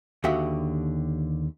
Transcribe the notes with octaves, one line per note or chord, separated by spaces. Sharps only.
D#2 D3 F#4 G4 E5 F#5